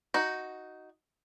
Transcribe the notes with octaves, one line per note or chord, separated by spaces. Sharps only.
D#4 F#4